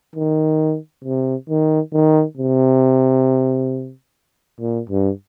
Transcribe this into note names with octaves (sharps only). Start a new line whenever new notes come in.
D#3
C3
D#3
D#3
C3
A#2
G2